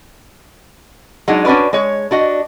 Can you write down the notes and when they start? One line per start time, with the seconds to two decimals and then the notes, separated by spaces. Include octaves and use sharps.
1.28 F#3 G#3 D4 D#4
1.45 C#4 D4 F#4 B4 D5
1.73 G#3 C#5
2.11 D4 F#4 D#5